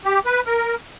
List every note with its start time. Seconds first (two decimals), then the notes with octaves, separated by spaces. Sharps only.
0.05 G4
0.26 B4
0.46 A#4